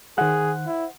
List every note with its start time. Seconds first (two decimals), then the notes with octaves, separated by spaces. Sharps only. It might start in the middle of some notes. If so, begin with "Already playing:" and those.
0.18 D#3 G#4 C5 F#5 F#6
0.67 E4